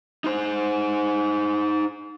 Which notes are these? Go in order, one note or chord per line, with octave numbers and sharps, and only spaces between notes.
D#4 C5